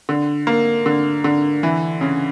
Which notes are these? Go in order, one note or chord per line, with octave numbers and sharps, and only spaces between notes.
D3
A#3
D3
D3
E3
C#3